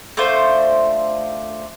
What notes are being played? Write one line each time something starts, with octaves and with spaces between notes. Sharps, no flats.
A3 D4 F4 C5